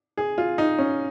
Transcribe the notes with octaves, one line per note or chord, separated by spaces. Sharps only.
G#4
F4
D#4
C#4